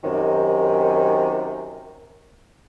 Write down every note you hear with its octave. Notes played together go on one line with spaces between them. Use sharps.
F#2 C3 D#3